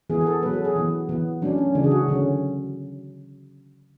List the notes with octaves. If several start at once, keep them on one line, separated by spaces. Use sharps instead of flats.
E3 B3 G#4
G#4
A4
F#3 B3 B4
A4
G#4
E3 B3
E3 B3
F#3 A3 C#4 D4
C#4
C#3 E3 A3 D4
G#4
F#4
D3 F#3 C#4